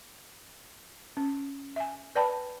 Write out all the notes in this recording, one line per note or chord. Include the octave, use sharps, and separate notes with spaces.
C#4
E5 G#5
B4 D5 G5 A5 B5